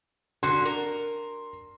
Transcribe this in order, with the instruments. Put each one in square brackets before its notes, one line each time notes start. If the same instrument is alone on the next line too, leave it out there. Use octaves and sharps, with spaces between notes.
[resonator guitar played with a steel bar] D3 F#4 [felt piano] C6
[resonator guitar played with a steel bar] A#4